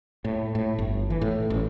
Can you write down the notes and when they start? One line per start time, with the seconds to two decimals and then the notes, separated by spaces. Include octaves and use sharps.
0.25 A2
0.55 A2
0.79 G1
1.10 E3
1.22 A2
1.50 A1